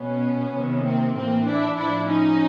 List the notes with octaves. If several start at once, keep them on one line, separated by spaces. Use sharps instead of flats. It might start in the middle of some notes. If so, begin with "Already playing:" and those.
Already playing: B2 B3 C#4
C3 D#3
A#3 C4
A2 E3 A#3 C4
D4 E4
A2 F3 D4 E4
C#4 D#4